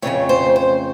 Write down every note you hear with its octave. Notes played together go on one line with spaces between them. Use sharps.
F2 C#3 E3 A3 C#5
C5
C5